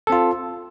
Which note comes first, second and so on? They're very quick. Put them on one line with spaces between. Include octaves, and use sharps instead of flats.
A4 C4 F4